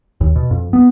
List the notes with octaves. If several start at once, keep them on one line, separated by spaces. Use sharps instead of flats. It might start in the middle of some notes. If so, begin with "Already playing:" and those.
D#2
B2
F2
B3